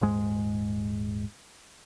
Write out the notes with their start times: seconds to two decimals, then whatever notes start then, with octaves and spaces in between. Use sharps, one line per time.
0.01 D#1 G#2 G#3